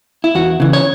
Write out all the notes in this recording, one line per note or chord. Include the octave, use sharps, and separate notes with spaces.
E4
E2 F#4
C#3 E3
C#5